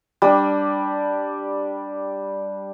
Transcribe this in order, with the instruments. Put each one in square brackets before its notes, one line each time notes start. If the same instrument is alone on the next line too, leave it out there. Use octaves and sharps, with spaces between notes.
[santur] G3 D4